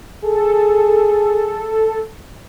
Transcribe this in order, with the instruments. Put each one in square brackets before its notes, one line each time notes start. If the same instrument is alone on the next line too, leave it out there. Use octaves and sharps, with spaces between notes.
[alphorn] G#4 [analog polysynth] A4